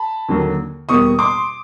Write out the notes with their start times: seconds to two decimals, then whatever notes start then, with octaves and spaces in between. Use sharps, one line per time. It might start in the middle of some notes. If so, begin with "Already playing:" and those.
Already playing: A5 B5
0.29 D#2 D3 F#3 A#3
0.89 E2 B2 G3 A#3 C#6 D#6
1.19 C6 D6